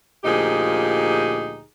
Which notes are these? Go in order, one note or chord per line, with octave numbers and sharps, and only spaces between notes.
D2 A#2 F3 D#4 G4 G#4